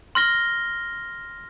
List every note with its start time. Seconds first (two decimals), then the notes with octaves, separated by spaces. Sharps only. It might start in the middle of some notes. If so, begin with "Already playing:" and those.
0.15 C6 F6 A#6 G7